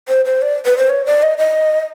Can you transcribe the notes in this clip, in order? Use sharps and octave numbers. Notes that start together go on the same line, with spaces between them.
C5
C5
D5
B4
C5
C#5
D5
D#5
D#5